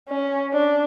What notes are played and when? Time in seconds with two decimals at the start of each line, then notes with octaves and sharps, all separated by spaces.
0.09 C#4
0.53 D4